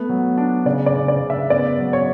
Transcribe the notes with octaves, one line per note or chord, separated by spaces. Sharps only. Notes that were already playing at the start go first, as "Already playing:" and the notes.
Already playing: A3 B3
F#3
D4
C#3 D5
D5
C#3
D5
C#3
E5
B3 D5
F#3
C#5